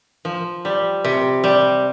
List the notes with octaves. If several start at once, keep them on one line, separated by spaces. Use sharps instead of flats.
F3
G3
C3
G3